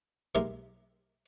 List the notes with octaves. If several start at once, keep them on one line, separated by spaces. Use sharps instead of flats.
B1 G#3 A#3 G4 A#4 E5